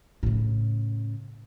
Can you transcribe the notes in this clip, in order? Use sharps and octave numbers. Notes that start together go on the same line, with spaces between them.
A2 C#3